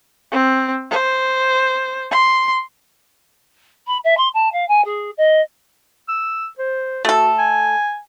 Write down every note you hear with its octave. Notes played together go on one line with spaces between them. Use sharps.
C4
C5
C6
B5
E5
C6
A5
F5
G#5
G#4
D#5
E6
C5
A3 F#4 A4
G#5